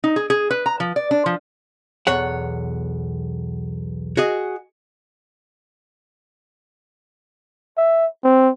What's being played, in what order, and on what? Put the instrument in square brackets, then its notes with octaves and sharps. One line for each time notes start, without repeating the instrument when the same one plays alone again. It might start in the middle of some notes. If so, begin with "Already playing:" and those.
[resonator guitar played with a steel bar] D#4
G#4
G#4
B4
A#5
F3
D5
D4
F3
[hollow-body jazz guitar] B1 E2 C#5 F#5
F#4 G#4 D#5
[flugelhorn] E5
C4